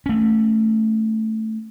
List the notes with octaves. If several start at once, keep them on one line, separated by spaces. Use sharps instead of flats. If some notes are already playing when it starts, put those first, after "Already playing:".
A3 C#4